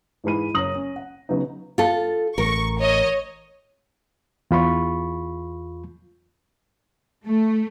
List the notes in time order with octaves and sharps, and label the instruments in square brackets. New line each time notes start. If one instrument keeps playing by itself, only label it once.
[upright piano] G#2 E3 G#3 B5 D#7
F#1 C#5 A#5 D#6 A#6 F#7
C#4
F#5
C#3 F#3 B3 D#4
[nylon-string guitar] F4 A4
[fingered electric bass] A1 [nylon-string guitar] A#4 [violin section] C#6
[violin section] C#5 D#5
[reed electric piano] E2 F4 B5 C#6
[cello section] A3